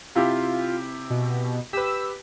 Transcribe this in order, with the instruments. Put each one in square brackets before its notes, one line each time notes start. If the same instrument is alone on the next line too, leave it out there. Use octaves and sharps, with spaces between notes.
[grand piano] C3 E4 G4 [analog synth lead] F4
[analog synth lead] B2
[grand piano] G4 B4 [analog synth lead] E6